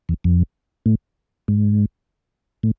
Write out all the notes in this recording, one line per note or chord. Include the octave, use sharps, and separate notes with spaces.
E2
F2
A2
G#2
A2